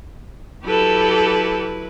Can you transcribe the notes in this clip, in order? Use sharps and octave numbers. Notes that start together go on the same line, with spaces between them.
F#3 E4 G4 A4 B4